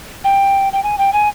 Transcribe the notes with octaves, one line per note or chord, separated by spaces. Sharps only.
G5
G5
G#5
G5
G#5